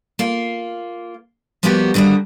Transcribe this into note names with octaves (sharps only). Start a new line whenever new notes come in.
A#3 F4
F3 G3 A#3 B3 F#4 G4
D3 D#3 G3 D#4 F#4